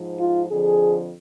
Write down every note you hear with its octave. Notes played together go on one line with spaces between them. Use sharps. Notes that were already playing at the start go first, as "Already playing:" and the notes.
Already playing: G#2 F3
F4
F2 D3 F3 G#4